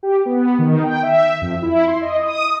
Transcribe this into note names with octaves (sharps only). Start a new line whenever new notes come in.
G4
B3
D#3
G5
E5
F2
E4
C6
D#5
D#6